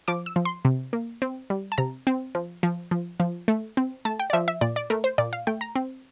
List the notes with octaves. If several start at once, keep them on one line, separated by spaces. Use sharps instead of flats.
F3 D6
E6
F3
C6
C3
A#3
C4
G3
A5
C3 A#5
C4
F3
F3
F3
F3
A3
C4
A3 A5
G5
D5
F3 E5
E5
A#2 D5
D5
A3 A#4
C5
A#2 D5
F5
A3 G5
A#5
C4